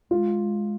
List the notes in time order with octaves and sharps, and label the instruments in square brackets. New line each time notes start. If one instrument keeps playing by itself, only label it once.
[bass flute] G#3 [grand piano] F4